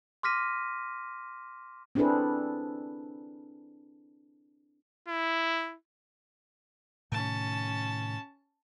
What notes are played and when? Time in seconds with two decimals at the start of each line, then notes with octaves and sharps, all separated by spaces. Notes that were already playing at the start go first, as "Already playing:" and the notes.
0.23 C6 D6 F6 A#6 B6 D#7
1.95 C4 D4 E4 G#4 A4 B4
5.08 E4
7.12 A2 C3 D#3 C#4 A5